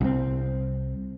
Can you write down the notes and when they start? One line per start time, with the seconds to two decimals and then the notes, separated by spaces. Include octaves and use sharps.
0.01 C2 C4